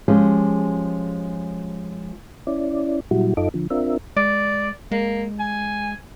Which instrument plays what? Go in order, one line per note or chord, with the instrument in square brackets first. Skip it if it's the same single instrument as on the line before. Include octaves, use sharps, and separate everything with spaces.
[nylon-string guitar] F3 G#3 C#4 G4 G#4
[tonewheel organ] C#4 E4 D5
A#2 F#3 G3 E4 F#4
F#2 D#4 F4 A4 D#5 D6
D3 F3
C4 D4 F4 A#4 E5
[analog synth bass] G#3 [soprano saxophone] D5
[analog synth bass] G#3 [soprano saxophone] A#3
[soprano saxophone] G#5